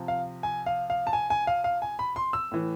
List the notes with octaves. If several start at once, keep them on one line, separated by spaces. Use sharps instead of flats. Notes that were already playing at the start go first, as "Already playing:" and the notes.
Already playing: C3 F3
F5
G#5
F5
F5
A5
G#5
G#5
F5
F5
G#5
B5
C6
E6
A2 E3